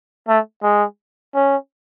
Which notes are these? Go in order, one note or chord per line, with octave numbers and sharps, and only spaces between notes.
A3
G#3
C#4